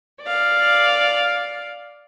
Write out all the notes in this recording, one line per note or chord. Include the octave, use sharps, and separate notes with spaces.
D5 F5